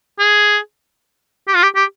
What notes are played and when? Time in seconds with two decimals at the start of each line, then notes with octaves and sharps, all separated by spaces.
0.19 G#4
1.48 G4
1.56 F4
1.63 G4
1.76 G4